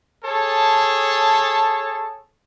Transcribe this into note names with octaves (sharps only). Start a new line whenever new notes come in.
G#4 A4 C#5 A5